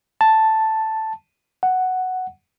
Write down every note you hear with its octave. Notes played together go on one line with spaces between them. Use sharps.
A5
F#5